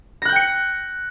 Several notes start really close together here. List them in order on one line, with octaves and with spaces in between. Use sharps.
A#6 F#6 G6 G5 C#7